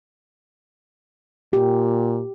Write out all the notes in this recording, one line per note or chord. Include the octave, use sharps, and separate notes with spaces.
A#2 G4